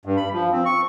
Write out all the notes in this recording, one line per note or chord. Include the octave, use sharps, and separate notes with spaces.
G2
B5
F3
C4
C#6